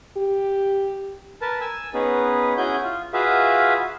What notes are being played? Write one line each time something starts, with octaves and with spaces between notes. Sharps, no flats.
G4
A#4 B4 A5
G#5 E6
B3 C#4 D#4 G#4 B4
C#4 E4 F#4 G#4 G#5 G6
F4
F4 F#4 G#4 B4 E5 F5